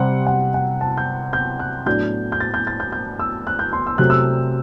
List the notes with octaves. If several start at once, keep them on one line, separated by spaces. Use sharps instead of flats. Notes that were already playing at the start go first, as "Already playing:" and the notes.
Already playing: C3 G3 C4 F#5
F#5
F#5
A5
G6
G6
F#6
A2 F#3 B3 D4 G6
G6
A6
G6
A6
G6
G6
E6
F#6
G6
C6
E6
C3 F#3 A3 C4 F#6
E6